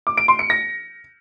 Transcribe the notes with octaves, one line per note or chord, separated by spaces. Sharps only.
D6
D7
C6
C#7
A#6